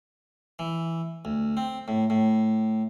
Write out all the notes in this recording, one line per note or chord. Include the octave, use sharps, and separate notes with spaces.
E3
D2
C4
A2
A2